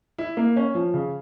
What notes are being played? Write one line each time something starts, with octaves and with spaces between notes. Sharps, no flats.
E4
A#3
C#4
F3
C#3